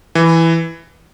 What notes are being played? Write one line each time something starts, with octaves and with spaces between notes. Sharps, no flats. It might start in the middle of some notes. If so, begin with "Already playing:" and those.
E3